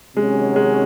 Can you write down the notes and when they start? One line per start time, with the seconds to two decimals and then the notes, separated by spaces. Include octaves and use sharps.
0.16 C3 D#3 F#3 G#3 C#4 F#4
0.56 G#3